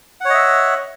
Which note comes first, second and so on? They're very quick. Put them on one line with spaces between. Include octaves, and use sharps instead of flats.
F#5 C#5 D#5 E5